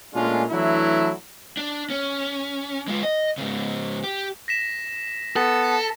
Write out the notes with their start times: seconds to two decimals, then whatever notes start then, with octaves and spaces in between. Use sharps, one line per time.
0.13 A#2 G#3 A3 C#4 D4 F4
0.50 E3 F#3 A3 D4 E4
1.57 D4
1.90 C#4
2.88 G#3 F4
3.03 D#5
3.38 G#2 C#3
4.03 G4
4.48 A#6 B6 E7
5.36 B3 A4